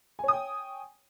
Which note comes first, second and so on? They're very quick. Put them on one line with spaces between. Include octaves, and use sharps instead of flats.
G#5 C#5 D#6 G5